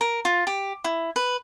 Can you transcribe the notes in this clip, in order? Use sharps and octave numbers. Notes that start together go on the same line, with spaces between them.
A#4
F4
G4
E4
B4